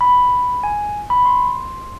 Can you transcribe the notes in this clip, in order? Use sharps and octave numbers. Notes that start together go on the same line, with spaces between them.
B5
G#5
B5
C6